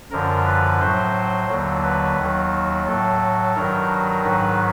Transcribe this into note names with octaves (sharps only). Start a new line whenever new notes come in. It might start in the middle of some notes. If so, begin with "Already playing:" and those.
F#2 D3 F3 A#4
B4
A2 F#3 C5
D#2 D3 F#3
B4
D#2 D#3 F#3
A2 F#3 A4
G2 D#3 F#3 A#4
G#2 D#3 F#3 B4